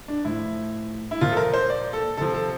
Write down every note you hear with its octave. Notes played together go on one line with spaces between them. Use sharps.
D4
A2 F3 E4
E4
A#2 F3 F4
A4
A#4
C5
D5
A4
C3 F3 A4
A4